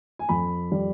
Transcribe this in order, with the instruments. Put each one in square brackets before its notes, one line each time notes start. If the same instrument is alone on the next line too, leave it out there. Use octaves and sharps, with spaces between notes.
[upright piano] G#5
F2 B5
G3